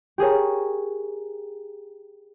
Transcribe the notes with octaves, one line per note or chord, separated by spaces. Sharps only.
G4 G#4 A#4 C#5